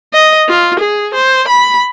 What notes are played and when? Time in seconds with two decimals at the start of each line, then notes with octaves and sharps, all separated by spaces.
0.14 D#5
0.49 F4
0.79 G#4
1.14 C5
1.48 B5